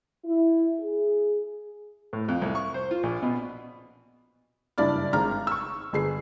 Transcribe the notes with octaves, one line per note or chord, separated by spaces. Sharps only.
E4
G#4
A2
F2
C2
C#6
C5
F4
A#1
B2
F#1 G2 D4 E4 D5 F6
G#1 G#3 A#5 F6
C#6 E6
G1 G#4 C7